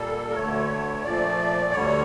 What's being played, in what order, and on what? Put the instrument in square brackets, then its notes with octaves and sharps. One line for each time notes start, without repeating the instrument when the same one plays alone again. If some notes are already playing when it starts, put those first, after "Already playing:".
Already playing: [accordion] A#2 G3 A#3 A4
A#4
D2 D3 A3 C#5
A#2 F3 A3 D5
D2 D3 G3 C#5